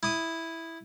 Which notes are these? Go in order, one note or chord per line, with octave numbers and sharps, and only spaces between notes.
E4 D#6